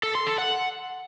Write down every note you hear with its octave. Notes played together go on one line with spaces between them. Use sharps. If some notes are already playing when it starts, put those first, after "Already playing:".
A4
C6
A4
F#5